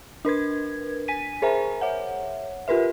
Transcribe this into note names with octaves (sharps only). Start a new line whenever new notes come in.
D4 A#4 B4 G#6
G#5 B6 D#7
G#4 A#4 C5 E5 G#5 A#5
C#5 E5 F#5
F4 G4 A#4 B4 E5